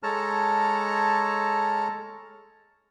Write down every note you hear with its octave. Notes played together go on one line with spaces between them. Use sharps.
G#3 A4 C#5 A5 A#5 F6